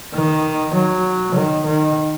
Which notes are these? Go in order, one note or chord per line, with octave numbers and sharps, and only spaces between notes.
D#3
F#3
D#3
D#3